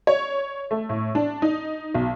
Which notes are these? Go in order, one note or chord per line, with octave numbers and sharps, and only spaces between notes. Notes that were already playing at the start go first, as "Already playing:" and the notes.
C#5
A3
A2
D4
D#4
B1